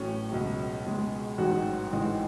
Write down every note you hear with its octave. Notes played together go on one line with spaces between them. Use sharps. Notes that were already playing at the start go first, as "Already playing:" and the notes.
Already playing: A1 A2 F#3 C#4
C#2 B2 F#3
C#2 B2 G#3
A1 G#2 F#3 F#4
A1 G#2 E3 G#3